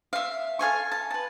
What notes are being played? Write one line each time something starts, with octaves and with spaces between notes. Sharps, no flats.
E5 F5
A4 F5 G#5 C#6
A5
B4 A5